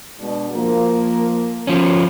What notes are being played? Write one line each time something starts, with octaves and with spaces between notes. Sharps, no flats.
B2 G#3 D4
F3 A#3
F3 C#4